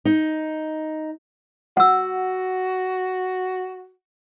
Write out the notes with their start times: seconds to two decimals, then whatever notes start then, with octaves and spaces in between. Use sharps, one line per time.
0.05 D#4
1.77 F#4 F#5 E6